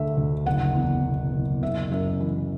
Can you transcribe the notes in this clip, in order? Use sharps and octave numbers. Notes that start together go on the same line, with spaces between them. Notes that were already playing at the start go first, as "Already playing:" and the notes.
Already playing: D2 D3 A3 E5
D2
F#1 F#5
E2
B2
F#1
F#1 E5
F#2 E5
E3